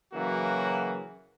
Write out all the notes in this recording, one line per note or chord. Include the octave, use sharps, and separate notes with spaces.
C#3 E3 F#3 A#3 F#4